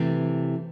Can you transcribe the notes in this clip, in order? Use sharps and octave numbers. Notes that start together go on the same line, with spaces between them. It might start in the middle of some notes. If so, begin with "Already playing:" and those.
Already playing: C3 E3 A3 C4